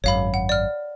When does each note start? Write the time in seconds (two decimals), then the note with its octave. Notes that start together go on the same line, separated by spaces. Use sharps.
0.04 G#1 F#2 C#5 F5 B5
0.34 F#5
0.49 D5 F6